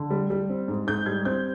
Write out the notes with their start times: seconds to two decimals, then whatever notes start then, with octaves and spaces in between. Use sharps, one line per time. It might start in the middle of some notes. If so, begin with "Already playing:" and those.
Already playing: D3
0.10 G3
0.30 G3
0.50 C4
0.68 G#2
0.87 G#2 G6
1.06 G3 G#6
1.25 C4 G6